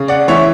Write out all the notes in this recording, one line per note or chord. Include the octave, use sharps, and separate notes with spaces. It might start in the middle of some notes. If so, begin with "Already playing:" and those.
Already playing: C#3
D5 F#5
E3 C#5 E5